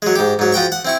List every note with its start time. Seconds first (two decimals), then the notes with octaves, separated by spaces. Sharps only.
0.02 F#3 G#3
0.15 G#2 G4
0.39 G#2 F#3
0.52 F3 F#4 G5 C#6
0.72 F#5
0.85 C4 E4 C#6